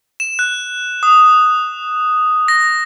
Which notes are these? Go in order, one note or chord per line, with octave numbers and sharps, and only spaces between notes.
E7
F#6
D#6
A#6